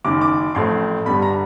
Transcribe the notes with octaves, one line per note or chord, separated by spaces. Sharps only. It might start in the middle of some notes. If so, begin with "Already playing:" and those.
F#1 F#2 D#3 D6
D6
A1 A2 F3 A3 C4 C6
G1 G2 D3 G3 B3 B5
A#5